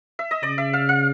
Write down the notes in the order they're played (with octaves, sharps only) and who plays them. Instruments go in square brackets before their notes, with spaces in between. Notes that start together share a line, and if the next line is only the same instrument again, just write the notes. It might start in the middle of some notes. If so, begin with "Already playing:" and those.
[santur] E5
D#5
[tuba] C#3 [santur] D5
[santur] E5
F5
F5